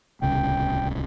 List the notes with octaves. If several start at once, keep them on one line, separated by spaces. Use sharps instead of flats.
D1 C2 C#3 G5